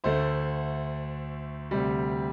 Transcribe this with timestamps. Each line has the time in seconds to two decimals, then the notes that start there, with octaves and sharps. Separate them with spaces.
0.04 D2 D3 A3 C5
1.71 D2 C3 G3